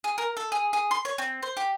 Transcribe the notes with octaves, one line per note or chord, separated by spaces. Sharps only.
G#4
A#4
A4
G#4
G#4
C6
C#5
C4
C5
G4